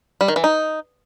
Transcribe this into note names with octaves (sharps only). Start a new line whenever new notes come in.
G3
D#3
E3
D#4